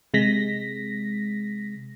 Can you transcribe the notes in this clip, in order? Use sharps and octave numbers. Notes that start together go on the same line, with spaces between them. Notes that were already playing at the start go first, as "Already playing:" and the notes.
C3 G#3 A#6 B6